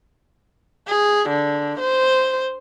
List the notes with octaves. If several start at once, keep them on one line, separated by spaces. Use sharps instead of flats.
G#4
D3
C5